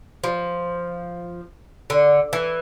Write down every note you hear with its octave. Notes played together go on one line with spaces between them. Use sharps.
F3
D3
E3